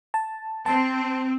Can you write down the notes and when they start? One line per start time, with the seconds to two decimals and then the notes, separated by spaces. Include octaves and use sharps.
0.14 A5
0.66 C4 A5